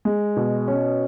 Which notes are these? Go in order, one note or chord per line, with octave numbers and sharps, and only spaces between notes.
G#3
B2
C#4